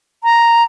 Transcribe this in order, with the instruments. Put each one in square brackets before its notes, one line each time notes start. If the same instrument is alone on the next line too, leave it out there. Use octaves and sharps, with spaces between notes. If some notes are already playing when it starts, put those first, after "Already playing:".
[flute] A#5